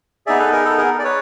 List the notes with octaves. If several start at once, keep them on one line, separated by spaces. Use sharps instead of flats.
B3 D#4 G#4 D5 E5
A4 B4
G#4 A#4
A4
G#4 A#4
D5
B4 C#5